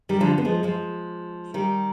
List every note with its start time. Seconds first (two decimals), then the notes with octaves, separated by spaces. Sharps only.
0.09 D#3 G3
0.20 D3 F3
0.38 B3
0.45 F3 G#3
0.63 F3 G#3
1.54 D#3 G3